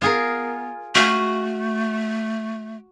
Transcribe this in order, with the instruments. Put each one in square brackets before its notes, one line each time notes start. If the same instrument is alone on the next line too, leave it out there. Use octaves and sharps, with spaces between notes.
[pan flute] B3 [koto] F4 G#4 A#4
[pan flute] A3 [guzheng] F#4 F5 G#5